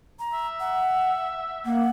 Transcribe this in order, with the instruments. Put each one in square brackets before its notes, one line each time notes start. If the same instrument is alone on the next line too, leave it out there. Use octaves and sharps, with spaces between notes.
[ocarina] A#5
[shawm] E5
[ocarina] F#5
[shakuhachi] A#3 [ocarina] F#5